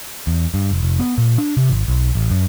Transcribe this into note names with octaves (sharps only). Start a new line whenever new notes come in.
E2
G2
F1
F1
B3
A#2
D4
C3
G#1
B1
A1
F#2